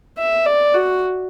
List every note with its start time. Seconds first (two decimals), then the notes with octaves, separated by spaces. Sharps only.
0.18 E5
0.46 D5
0.74 F#4